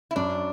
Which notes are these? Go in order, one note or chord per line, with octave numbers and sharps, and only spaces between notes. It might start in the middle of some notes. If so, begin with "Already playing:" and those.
E4
F#2 D4